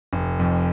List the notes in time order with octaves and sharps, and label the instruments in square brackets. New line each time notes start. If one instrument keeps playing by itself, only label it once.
[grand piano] F1
F2